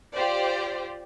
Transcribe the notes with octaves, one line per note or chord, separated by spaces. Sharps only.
F4 G4 C5 D5